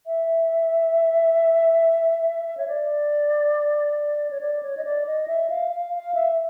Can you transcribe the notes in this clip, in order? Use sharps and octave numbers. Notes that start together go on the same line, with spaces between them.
E5
C#5
D5
C#5
D5
C#5
D#5
D5
D#5
E5
F5
F5
F5
E5